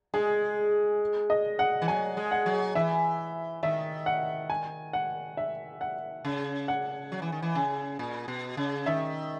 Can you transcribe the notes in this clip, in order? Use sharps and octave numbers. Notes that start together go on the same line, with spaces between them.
G#3 G#4
D#5
F#5
E3
F#3 G#5
G#3
F#5
F#3
E3 E5
D#3 E5
F#5
G#5
F#5
E5
F#5
C#3
F#5
F#3
E3
D#3
E3
C#3
A#2
B2
C#3
D#3 E5